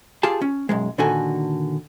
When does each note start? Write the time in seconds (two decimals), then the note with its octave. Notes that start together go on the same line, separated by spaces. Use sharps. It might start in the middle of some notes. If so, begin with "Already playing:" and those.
0.23 F4 G4 G#4 A5
0.42 C#4
0.69 B1 F#2 G#3
0.98 A#2 D3 D#3 F#4 A4 G#5